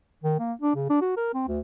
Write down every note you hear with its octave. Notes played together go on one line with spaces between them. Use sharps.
D#3
A#3
D4
C#3
D4
F#4
A#4
C4
D2